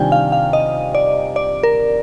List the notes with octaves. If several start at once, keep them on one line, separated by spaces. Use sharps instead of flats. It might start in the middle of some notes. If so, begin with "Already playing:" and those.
Already playing: C3 D#3 G3 D4 F4 G5 G#5
F5
F5
D#5
D5
D5
A#4